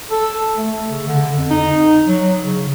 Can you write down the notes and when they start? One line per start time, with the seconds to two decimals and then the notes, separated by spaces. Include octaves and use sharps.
0.11 A4
0.56 A3
0.88 C#3
1.08 D3
1.38 F2
1.50 D#4
2.08 F#3
2.42 C#3